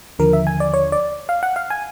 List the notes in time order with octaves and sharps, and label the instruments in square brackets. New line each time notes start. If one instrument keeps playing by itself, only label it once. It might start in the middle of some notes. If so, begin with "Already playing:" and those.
[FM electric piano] D#2 D3 F3 A#4
E5
G#5
D5
C#5
D5
F5
F#5
F5
G#5